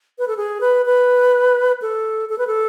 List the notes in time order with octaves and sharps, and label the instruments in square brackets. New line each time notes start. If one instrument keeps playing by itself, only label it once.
[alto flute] B4
A4
G#4
B4
B4
A4
A4
B4
A4